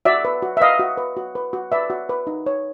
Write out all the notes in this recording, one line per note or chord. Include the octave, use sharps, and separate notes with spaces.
F#4 D5 E5
B4
F#4
E5
B4 D#5 F5
F#4
B4
F#4
B4
F#4
B4 D5 E5
F#4
B4
D#4
C#5